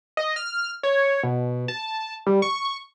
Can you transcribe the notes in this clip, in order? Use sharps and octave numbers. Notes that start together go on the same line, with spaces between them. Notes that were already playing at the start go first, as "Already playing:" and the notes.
D#5
F6
C#5
B2
A5
G3
C#6